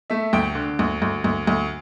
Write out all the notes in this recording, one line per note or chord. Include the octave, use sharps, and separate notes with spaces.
A3 E5
D2 G5
D3
D2
D2
D2
D2